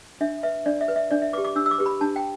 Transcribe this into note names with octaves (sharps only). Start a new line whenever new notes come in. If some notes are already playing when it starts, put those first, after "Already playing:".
D4 E5
B4 E5
D4 D5
E5
B4
E5
D4 D5
E5
G4 B4 D6
D6
D4 E6
E6
D6
G4 B4
B5
D4 A5
G5